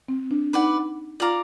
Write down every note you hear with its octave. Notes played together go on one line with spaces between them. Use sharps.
C4
D4
D#4 B4 D5 F#5
F4 D5 F5 A#5 D6